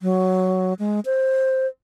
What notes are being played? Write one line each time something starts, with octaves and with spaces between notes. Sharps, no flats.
F#3
G#3
C5